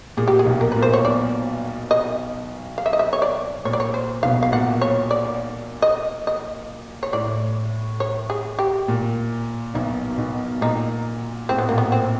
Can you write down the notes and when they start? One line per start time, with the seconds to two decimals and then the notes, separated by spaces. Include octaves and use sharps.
0.17 A#2 G#4
0.28 G4
0.39 G#4
0.46 B1 B2
0.61 A#4
0.72 A#2 B4
0.82 C5
0.93 C#5
1.04 B1 B2 D5
1.91 D#5
2.78 F5
2.86 E5
2.93 D#5
2.99 E5
3.13 C#5
3.22 D5
3.65 A#2 C#5
3.73 D5
3.80 C#5
3.94 C5
4.23 B1 B2 F5
4.43 F5
4.52 A#2 F#5
4.81 C#5
5.11 D5
5.82 D#5
6.27 D#5
7.03 C#5
7.13 A2 D5
8.00 C#5
8.30 G#4
8.59 G4
8.88 A#2
9.74 B1 B2 E4
10.18 B1 B2
10.61 A#2 D#4
11.49 A2 C4
11.58 B3
11.69 A#2 A#3
11.78 B3
11.92 C4